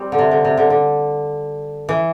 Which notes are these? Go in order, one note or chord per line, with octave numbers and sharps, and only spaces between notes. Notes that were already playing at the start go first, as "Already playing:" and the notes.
Already playing: G3 C4
D3
C3
D3
C3
D3
D3
E3